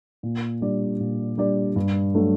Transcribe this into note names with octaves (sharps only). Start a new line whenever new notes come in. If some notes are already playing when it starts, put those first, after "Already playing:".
A#2
G3 D4 G4 D5
A#2
G3 D4 G4 D5
G2
F#3 A3 D4 F#4